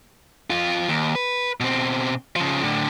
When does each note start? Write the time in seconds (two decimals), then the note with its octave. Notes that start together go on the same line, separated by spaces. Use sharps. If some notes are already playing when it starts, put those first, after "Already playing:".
0.50 F2 F4
0.88 D#2
1.15 B4
1.60 B2 C4
2.36 C#3 F3
2.63 A2 D3